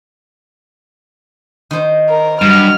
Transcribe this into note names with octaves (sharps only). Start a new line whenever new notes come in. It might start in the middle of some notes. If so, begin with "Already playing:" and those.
D#3 C5
A#4
G2 F#3 F6